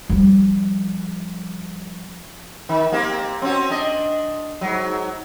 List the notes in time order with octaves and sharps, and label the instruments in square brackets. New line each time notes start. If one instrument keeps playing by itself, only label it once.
[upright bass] F3 G3
[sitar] D#3
A#3 C4 G4
C4 C#4 F#4
D4 D#5
G#2 F#3